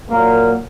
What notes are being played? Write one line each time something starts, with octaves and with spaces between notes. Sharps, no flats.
A#2 F#3 A#3